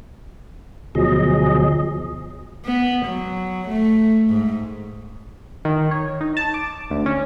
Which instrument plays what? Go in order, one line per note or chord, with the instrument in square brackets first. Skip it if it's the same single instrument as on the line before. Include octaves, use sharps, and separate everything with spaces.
[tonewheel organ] D2 B2 F3 F#3 G#4 D#5
[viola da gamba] B3
F#3
A3
G#2
[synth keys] D#3
C#5
D#4
A5
D6
D2
C#4